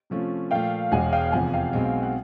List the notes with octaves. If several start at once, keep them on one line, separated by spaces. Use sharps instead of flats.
C3 F3 A3 C#4 F4
A#2 F3 A3 F5 G5
E1 E2 B2 G#3 F#5 G#5
F5 G5
F1 E2 C3 F3 F#5 G#5
F5 G5
B1 B2 G#3 C4
F#5